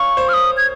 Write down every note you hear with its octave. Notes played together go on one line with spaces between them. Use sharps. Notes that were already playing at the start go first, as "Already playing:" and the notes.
Already playing: C#5 F5 C#6
C5
F6
D#6
G#6